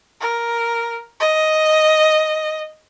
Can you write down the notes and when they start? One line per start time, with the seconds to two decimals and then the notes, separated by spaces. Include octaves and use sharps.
0.21 A#4
1.20 D#5